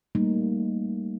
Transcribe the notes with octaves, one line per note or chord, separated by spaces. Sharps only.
G3 A3 A#3 D#4